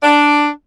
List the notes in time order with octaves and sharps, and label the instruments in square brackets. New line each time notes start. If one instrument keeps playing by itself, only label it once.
[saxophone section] D4